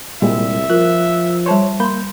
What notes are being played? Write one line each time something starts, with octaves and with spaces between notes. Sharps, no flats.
C2 A#2 G3 G#3 E5
F3 F4 A#4 F#6
G3 C5 C#5 A5 C6
A#3 B5 C6 G6